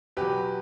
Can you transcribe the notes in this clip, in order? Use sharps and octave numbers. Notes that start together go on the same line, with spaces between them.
E2 B2 F#3 G4 B4